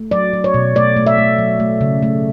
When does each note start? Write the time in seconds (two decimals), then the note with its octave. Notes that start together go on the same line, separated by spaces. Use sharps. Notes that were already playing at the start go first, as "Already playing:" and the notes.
Already playing: A3
0.11 F#3 D5
0.33 F#3
0.44 C#5
0.54 B2
0.75 A3 D5
0.97 A3
1.07 E5
1.18 A3
1.39 F#3
1.60 A3
1.81 C#3
2.03 A3